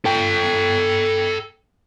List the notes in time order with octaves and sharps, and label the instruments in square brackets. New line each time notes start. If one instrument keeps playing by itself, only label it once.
[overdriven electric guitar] A4 G5